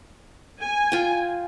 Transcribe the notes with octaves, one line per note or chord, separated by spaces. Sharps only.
G#5
F4 G5